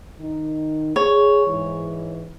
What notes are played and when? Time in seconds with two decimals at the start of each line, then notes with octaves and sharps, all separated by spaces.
0.19 D#3 D#4
0.96 G#4 C#5
1.45 G#2 E3